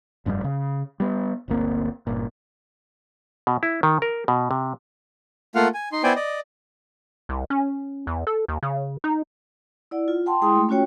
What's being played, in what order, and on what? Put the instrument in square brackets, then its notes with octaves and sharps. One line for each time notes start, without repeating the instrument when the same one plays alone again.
[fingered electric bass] F1 G2 B2 G3
C#3
G3 B3
G1 D2 A#3 C4
G1 A#2
[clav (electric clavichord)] B2
E4
D#3
A#4
B2
C3
[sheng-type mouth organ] A3 A#3 F4 F5 F#5
G#5
D#4 C6
B3 E4 C5 D5 G5 G#5
D5 D#5
[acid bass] C2
C#4
E2
A4
D#2
C#3
D#4
[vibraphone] E4 D5 F#5
F4
F#5 G5 A5 C6
G#3 E4 G#4 G5 C6 D#6
A3
C#4 F4 F#4 C#5 G5